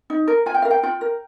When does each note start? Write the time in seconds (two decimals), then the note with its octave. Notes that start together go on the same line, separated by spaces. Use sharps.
0.10 D#4
0.28 A#4
0.46 F4 G#5
0.54 G5
0.62 A#4 F5
0.71 G5
0.83 F4 G5
1.01 A#4